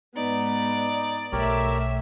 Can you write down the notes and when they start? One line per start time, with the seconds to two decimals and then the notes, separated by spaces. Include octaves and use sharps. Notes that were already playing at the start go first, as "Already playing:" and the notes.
0.16 G#2 B3 D#4 D5
1.33 B1 A3 G4 A#4 C#5 E5